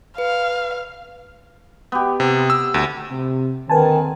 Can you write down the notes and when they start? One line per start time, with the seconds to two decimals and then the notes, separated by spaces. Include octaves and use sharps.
0.18 B4 F5
1.92 B3 G4
2.20 C3
2.50 E6
2.74 D2
3.11 C3
3.70 D#2 D3 D#3 C4 B4 G#5 A5